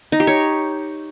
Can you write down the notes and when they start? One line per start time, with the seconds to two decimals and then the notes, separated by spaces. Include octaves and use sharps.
0.12 D#4
0.20 G4
0.27 C#5